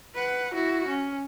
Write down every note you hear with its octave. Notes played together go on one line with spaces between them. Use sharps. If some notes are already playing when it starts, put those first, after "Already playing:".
B4 F#5
E4 F#4
C#4